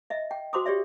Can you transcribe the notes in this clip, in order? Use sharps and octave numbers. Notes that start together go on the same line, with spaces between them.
D#5 E5
G5
F#4 C5 C6 D6 D#6
G4 C#5 D5 E5